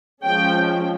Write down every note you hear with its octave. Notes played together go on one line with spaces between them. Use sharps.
F3 G#3 C#4 G5